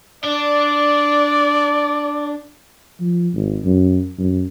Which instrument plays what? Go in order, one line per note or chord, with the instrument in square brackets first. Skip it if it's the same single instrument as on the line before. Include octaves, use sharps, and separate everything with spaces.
[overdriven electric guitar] D4 [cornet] D5
[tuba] F3
G#1
F#2
F#2